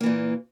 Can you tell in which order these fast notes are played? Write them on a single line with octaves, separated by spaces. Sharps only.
A#3 E3 A#2